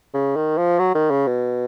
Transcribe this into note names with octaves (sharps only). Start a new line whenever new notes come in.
C#3
D#3
F3
F#3
D#3
C#3
B2